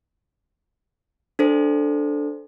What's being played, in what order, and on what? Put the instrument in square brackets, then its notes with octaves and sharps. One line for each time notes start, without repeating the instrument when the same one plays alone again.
[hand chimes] D4 A4 C5